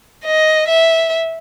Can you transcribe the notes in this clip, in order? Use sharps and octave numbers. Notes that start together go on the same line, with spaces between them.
D#5
E5